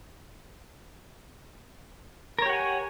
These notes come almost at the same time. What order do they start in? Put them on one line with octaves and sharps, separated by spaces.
A#4 C#5 G4 F#5 G#5